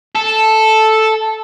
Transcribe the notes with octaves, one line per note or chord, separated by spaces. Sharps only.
A4